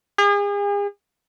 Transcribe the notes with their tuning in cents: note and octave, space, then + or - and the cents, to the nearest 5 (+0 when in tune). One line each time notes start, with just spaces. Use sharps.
G#4 -40